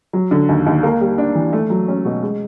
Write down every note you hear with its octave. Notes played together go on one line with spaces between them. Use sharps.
F#3
D3
D#2
D#2
A#3
G3
D4
E3
A3
F#3
C#4
B2
G#3